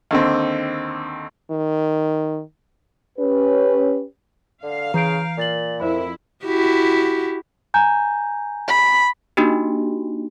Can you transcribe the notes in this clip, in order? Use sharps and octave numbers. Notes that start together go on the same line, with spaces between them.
D#2 D3 C4
D#3
C#4 G4 B4
D3 F5
C#3 E3 A#5 G6 D7
A#2 A#4 A6 F#7
F2 E4 A#4 C5 B5
E4 F#4 G4
G#5 A#5 G6
B5
A#3 D4 D#4 F#4 G4